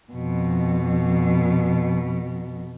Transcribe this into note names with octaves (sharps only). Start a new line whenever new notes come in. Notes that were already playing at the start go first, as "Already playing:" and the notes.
F2 B2